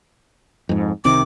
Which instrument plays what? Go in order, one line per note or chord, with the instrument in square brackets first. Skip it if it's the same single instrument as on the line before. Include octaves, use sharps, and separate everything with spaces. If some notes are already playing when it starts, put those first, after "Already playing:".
[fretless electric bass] F2 G#2
[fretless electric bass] C2 C3 D#3 [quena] D6